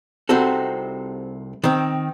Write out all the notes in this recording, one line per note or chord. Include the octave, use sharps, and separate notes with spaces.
C2 C3 C4 D#4 F#4 A4
D#3 C4